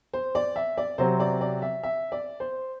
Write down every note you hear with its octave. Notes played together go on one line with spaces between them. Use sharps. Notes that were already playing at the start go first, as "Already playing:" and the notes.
C5
D5
E5
D5
C3 F#3 C4 C5
D5
D5
E5
E5
D5
C5